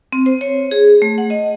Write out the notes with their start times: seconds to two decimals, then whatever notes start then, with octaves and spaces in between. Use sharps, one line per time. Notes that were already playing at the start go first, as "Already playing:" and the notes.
0.13 C4
0.26 C5
0.41 C#5
0.71 G#4
1.02 A3
1.18 F#5
1.30 D#5